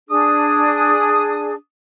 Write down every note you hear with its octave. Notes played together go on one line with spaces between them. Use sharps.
D4 G#4 D#6